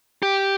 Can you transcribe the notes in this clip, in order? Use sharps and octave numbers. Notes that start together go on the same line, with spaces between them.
G4